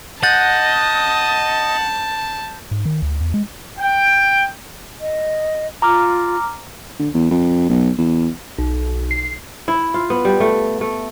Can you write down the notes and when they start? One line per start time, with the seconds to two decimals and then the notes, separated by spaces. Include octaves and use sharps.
0.23 D#5 F#5 A5 G6 A6
2.71 G#2
2.86 D#3
3.02 D2
3.20 E2
3.34 G#3
3.79 G5
5.00 D#5
5.82 F4 A#5 D6 F6
6.99 D3
7.14 E2
7.31 F2
7.69 B1
7.98 E2
8.58 B1
9.11 C7
9.68 E4
9.94 F4
10.10 B3
10.25 G3
10.40 A3
10.81 A3